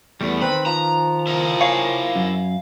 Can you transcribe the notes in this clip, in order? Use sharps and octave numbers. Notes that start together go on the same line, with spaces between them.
E2 G3 A3 B3
D#3 C4 B4 B5
F3 A#5
E4 A#4
C#5 F5 G#5
F#2